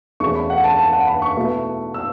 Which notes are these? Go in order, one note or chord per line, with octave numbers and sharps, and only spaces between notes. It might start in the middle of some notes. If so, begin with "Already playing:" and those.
E2 B2 A3 C#4 C#6
B5
F#5
A5
A5
F#5
B5
C#6
B2 A3 E4
E6